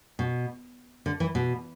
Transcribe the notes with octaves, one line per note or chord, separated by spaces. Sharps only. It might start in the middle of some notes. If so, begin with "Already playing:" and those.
B2
D3
E3
B2